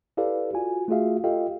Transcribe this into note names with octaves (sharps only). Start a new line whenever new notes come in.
E4 G4 A4 B4 D5 F5
F4 F#4 G#5
A3 F4 F#4 G#4 E5 F5
F4 G4 A4 D#5 F5 G5